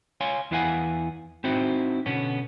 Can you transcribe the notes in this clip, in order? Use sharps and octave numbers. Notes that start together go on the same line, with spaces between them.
C#5 F5 G#5 C6
E2 E4 B4 F5 F#5 G#5
C4 D#4 E4 F#4 C5
B2 D3 B3 C#4